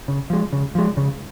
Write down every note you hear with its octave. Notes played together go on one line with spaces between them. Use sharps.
C#3
F3 G#3
C#3
F3 G#3
C#3